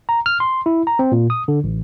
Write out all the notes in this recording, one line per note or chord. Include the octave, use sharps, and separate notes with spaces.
A#5
F6
C6
E4
A#5
C4
A#2
D#6
D3
A1